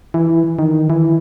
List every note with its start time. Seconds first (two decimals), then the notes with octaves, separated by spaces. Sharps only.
0.14 E3
0.59 D#3
0.90 E3